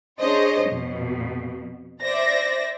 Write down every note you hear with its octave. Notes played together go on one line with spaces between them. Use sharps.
D4 G#4 C5 C#5 D#5
F2 B2
C5 D5 E5 A#6